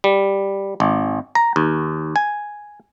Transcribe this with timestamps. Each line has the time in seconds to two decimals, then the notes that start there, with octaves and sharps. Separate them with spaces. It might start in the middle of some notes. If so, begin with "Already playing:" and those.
0.04 G3
0.80 G#1
1.35 A#5
1.56 D#2
2.16 G#5